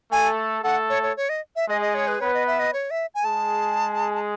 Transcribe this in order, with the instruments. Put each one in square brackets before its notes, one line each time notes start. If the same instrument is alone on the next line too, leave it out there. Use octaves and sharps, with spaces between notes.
[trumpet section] A3 A4 [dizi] G#5
[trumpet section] A3 A4 [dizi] F#5
[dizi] C#5
C#5
C#5
D#5
E5
[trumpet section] G#3 G#4 [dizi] D#5
[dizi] D#5
C#5
B4
[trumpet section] B3 B4 [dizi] C#5
[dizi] D#5
E5
D#5
C#5
E5
G#5
[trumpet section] G#3 G#4 [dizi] A5